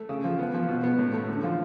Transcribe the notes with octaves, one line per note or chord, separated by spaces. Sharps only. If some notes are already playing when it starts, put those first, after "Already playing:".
Already playing: A3
C#3
F3
B3
F3
B2
B3
A2
A3
D3
F3